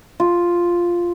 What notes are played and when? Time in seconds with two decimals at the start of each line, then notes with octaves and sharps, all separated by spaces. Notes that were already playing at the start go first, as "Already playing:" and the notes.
0.20 F4